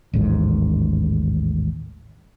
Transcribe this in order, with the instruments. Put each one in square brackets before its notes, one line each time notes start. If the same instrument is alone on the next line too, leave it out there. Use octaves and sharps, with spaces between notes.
[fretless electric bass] A1 D#2 G#2